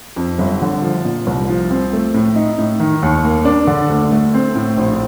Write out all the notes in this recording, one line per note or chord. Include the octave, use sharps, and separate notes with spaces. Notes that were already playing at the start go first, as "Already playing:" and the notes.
F2
G1
D3
F3
A#2
C2
F3
C4
A3
A2
D#4
A2
D#3
D#2
A#3
D4
D3
D2
A3
C4
A2
A#1